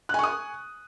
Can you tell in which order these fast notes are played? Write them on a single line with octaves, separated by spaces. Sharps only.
F#6 G#5 C#6 D#6